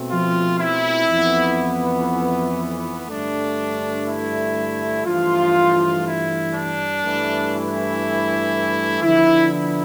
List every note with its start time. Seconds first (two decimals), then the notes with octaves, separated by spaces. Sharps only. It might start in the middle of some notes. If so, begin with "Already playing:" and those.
Already playing: B2 A3 C4
0.10 F3 F4
0.60 E4
1.09 F2 E3 B3
3.07 G2 D3 A3 D4
4.07 E4
5.06 G2 E3 F3 A3 F4
6.05 E4
6.55 D4
7.04 G2 E3 A3
7.54 E4
9.03 D3 F3 B3 D4 E4
9.52 E4